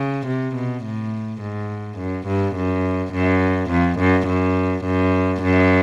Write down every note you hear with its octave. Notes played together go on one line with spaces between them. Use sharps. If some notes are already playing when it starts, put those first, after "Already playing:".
Already playing: C#3
C3
B2
A2
G#2
F#2
G2
F#2
F#2
F2
F#2
F#2
F#2
F#2